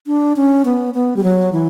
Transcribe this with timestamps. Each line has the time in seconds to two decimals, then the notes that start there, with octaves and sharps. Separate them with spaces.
0.07 D4
0.36 C#4
0.65 B3
0.94 B3
1.17 G3
1.23 F#3
1.53 E3